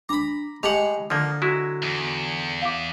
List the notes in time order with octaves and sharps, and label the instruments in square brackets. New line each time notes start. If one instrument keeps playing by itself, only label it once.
[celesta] D4 D6 [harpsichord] A#5 B5
[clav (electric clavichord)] A2 F#5 [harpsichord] G#3 G4 [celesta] F7
[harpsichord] D3 [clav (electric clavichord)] F3 A#3
[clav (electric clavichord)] F#3 G#3 E4 [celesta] F#4
[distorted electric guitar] E2
[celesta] F5 D6